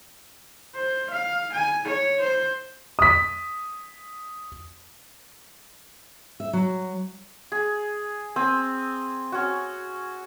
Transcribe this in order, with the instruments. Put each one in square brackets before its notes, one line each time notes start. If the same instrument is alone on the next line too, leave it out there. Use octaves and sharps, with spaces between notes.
[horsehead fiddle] C5
F5
G#5
C#5
C5
[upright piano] D#6 B6
[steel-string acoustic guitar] E5
F#3
[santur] G#4
C4 G#5 E6
C#4 F#4